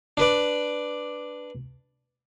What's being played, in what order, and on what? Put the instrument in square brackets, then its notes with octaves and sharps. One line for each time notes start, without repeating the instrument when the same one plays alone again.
[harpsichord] D4 B4 D5